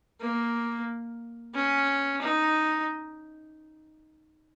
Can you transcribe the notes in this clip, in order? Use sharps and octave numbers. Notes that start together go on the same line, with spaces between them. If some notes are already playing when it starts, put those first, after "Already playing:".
A#3
C#4
D#4